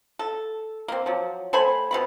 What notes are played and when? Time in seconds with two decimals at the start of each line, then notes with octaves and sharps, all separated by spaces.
0.19 A4
0.88 A#3 C4
1.06 F3 F#3
1.53 A3 C5 G#5 B5
1.91 B2 C4 B5